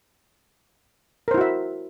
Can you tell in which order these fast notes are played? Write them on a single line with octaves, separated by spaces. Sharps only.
A#4 C5 E4 F#4 E5